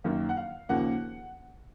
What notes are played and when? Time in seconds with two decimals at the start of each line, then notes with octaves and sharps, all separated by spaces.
0.04 F#2 D#3 A#3
0.29 F#5
0.37 F5
0.69 D#2 C#3 F3 A#3 F#5